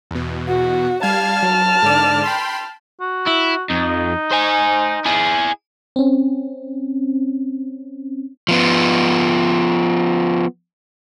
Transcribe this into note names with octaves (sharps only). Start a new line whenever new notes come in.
E2 B2
F#4
G3 F5 A5 F6 G#6
F#3
G#2 D3 D5
G5 B5 C6
F#4
E4
F2 D#4
C5 G#5
E4 G#4
C4 C#4
F3 B3